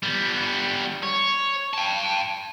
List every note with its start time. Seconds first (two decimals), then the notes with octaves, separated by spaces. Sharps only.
0.03 G3 B3
1.03 C#5
1.74 G5 A5